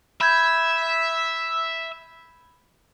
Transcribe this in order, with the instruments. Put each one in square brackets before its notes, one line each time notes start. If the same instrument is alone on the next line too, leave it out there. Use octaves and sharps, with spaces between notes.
[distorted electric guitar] E5 [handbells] B5 G6 G#6